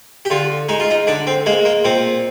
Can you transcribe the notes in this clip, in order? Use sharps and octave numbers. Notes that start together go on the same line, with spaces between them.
G4
D3 F4
G#3 D#4
F4
D#4
D3 D4
C4
G#3 A#3
A#3
A#2 C4